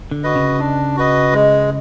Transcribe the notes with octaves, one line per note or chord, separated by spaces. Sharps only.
D3
F#4 B4 D#5
C#3
D4
F#4 B4 D#5
G#3